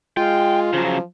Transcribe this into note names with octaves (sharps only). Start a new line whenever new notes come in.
G#3 F4 G5
C#3 F3 F#3